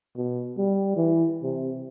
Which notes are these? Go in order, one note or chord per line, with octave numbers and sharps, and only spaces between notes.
B2
G3
E3
C3